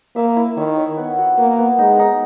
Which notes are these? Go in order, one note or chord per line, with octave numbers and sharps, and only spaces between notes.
A#3 E5
E4
D#3 C#5
C#5
B3
F#4
A#3 B3
B3
G#3 D#4
D#4